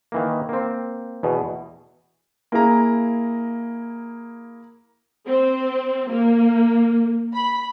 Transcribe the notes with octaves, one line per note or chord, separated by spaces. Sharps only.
D#3 E3 A#3
A#3 C4
E2 B2
A#3 E4 G#4 A#5
C4
A#3
B5